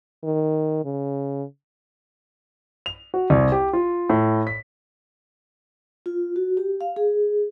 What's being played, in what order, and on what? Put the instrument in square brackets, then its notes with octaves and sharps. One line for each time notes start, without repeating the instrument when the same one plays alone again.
[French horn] D#3
C#3
[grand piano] F7
F#4
C2
G4
F4
A2
B6
[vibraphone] F4
F#4
G4
F5
G#4